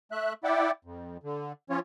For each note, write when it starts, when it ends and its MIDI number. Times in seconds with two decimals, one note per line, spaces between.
0.12 0.33 57
0.12 0.33 76
0.12 0.33 90
0.44 0.71 64
0.44 0.71 74
0.44 0.71 76
0.44 0.71 78
0.44 0.71 79
0.44 0.71 86
0.85 1.17 41
1.23 1.52 50
1.70 1.79 53
1.70 1.79 61
1.70 1.79 65
1.70 1.79 73